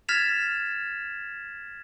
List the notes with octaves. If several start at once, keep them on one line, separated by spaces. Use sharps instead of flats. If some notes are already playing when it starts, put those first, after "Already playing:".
F6 G#6 A6 B6 E7 F7